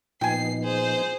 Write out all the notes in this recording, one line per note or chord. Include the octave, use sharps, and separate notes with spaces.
A#2 F3 B3 D#4 G5 G#5 C7
G#4 C5